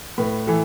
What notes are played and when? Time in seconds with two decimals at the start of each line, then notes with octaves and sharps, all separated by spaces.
0.18 A2 B4
0.47 E3 A4